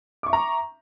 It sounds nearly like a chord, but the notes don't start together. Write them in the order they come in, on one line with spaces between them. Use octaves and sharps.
D6 C#6 E5 A#5